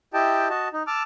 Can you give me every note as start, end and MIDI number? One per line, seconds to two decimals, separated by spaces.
0.14 0.48 64
0.14 0.48 67
0.14 0.48 75
0.14 0.48 79
0.14 0.48 81
0.50 0.68 66
0.50 0.68 75
0.50 0.68 81
0.73 0.83 63
0.87 1.03 81
0.87 1.03 86
0.87 1.03 88
0.87 1.03 89